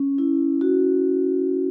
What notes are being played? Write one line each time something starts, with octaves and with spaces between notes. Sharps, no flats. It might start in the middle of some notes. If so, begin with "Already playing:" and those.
Already playing: C#4
E4
F#4